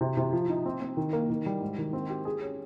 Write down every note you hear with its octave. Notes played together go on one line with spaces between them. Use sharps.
C3
C3
F3
D#4
C4
C4
D#3
A#3
D#3
G3
G#2
D#3
C4
G4
G#4
C#4